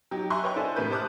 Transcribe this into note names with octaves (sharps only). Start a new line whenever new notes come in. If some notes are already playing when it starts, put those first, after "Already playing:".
F#3 D#4 G4
E5 G#5 A#5 C6 C#6 F#6
B4 C#5 D#5 G5 C#6
D4 E4 A4 C5 G#5
G#1 A2 C3 A#4 B4 G6
C5 A5 D6 D#6 F6 F#6